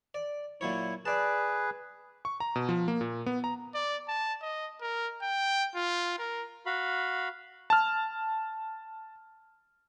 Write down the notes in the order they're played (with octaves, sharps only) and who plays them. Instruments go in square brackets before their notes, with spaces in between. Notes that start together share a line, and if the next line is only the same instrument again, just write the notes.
[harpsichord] D5
[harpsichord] A#2 F#3 C#5 [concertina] E4
[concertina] G#4 B4 [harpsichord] D5 A5
[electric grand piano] C#6
A#5
B2
F3
A#3
A#2
B3
A#5
[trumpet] D5
A5
D#5
A#4
G5
F4
A#4
[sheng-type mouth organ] F#4 F5 B5
[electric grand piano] A5 F6